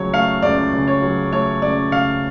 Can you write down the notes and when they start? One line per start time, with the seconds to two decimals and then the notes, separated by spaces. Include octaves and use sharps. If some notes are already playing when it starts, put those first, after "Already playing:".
Already playing: C#2 C#3 F#3 A3 C#5
0.13 A3 F5
0.42 C#2 D5
0.73 C#3
0.87 C#5
1.02 F#3
1.32 A3 C#5
1.62 C#2 D5
1.92 C#3 F5